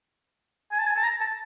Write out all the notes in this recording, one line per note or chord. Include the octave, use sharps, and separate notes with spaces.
G#5
A5
G#5
A5
A#5
A5